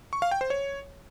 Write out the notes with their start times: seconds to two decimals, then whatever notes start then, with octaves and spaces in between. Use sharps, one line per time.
0.13 C#6
0.22 F5
0.31 G5
0.41 C5
0.50 C#5